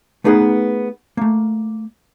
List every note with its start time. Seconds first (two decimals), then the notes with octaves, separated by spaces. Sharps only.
0.24 A3 B3 D#4 G#4 A#4 B4
1.17 A3 A#3